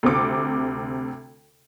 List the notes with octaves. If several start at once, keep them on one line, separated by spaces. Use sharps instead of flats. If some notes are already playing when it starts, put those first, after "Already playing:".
D2 C3 C4 D6 C#7